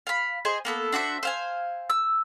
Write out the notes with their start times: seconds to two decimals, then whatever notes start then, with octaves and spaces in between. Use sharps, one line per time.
0.07 F5 B5
0.45 G#4 C5 D#5 G#5
0.65 A#3 B3 A4
0.92 D4 F#4 C5 E5
1.23 C5 F5 G#5
1.90 E6